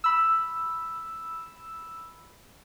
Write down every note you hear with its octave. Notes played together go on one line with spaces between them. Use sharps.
B5 E6